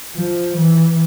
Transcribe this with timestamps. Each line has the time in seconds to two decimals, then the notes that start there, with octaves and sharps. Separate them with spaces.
0.16 F3
0.58 E3